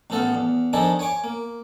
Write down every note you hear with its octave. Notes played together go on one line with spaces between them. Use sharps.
A1 A2 B3 A4 F5 A5
E2
D#3 F3 D4 D#4 G#4 A4
C#5 G#5 C#6 D6
A#3